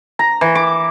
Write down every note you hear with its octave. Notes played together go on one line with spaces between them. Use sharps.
A#5
E3
D6